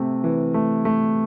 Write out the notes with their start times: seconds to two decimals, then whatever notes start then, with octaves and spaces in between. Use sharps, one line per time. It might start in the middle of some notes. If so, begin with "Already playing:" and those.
Already playing: C3 A3
0.24 E3
0.54 A3
0.85 A3